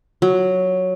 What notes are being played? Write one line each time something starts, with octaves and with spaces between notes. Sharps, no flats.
F#3